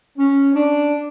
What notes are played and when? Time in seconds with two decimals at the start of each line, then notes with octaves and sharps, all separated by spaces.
0.17 C#4
0.54 D4